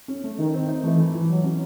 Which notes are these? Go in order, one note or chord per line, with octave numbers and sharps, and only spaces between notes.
C#4
A3
D#3 D#4
C4
D#4
E3 A3
E3
E3
F#3 F#4
C#4